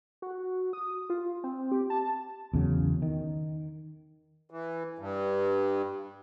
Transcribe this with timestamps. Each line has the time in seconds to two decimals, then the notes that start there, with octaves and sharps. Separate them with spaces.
0.22 F#4
0.73 D#6
1.10 F4
1.44 C4
1.72 G4
1.90 A5
2.54 E2 C#3 F#3
3.02 D#3
4.50 E3
4.99 G2